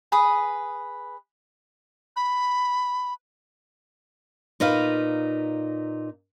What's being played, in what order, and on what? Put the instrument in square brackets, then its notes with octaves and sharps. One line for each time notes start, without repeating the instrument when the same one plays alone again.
[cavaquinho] G#4 B4 B5 D#6
[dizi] B5
[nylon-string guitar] A#2 D#4 B4 F5